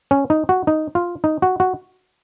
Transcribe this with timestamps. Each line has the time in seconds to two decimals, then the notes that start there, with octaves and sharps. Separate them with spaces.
0.11 C#4
0.30 D#4
0.49 F#4
0.67 D#4
0.95 F4
1.24 D#4
1.42 F#4
1.60 F#4